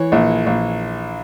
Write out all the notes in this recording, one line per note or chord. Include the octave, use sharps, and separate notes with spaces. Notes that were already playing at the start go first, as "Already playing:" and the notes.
Already playing: E3 C#5
A#1
A#1